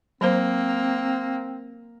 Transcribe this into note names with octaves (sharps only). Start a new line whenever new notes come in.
F#3 A#3 C4 C5